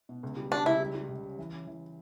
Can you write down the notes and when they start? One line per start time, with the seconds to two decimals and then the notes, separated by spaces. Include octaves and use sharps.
0.09 B2
0.23 C#2
0.37 G3
0.51 G3 D4
0.66 C#2 E4
0.80 G3
0.95 G3
1.09 C#2
1.23 C#3
1.38 E3
1.53 C#4
1.67 E3